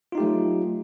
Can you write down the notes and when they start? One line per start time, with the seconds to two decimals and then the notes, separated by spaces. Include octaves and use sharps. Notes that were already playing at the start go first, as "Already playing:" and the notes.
0.12 F4
0.15 D#4
0.18 G4
0.20 A3
0.23 F#3